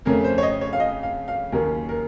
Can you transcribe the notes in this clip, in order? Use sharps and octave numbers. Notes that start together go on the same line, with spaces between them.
F2 C#3 A3 A#4
C5
C#5
D#5
C#5
F5
D#5
F5
F5
D#2 C#3 F#3 A#3 C#4 A#4
A#4